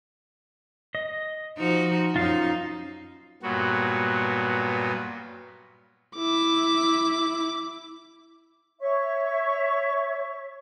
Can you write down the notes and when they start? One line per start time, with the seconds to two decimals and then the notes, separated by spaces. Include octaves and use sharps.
0.95 D#5
1.58 F3 D#4 F#4
2.16 F#2 D#4 F4 F5
3.43 G2 A#2 F#3 B3 F#4
6.16 E4 D6
8.81 C#5 E5 C#6